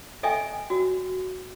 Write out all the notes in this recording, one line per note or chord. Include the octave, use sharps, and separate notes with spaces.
A4 D#5 E5 G5 G#5
F#4